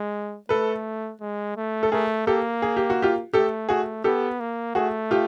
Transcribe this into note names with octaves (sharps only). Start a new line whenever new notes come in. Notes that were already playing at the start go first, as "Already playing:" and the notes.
Already playing: G#3
A3 A4 B4
G#3
A3
A4
A3 G#4 A#4
A#3 G4 A4
G#4
G4
F#4
F4 G4
A3 G4 A4
A3 F#4 G#4
B3 G4 A4
A#3
A3 F#4 G#4
F4 G4